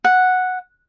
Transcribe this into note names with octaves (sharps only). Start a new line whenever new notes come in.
F#5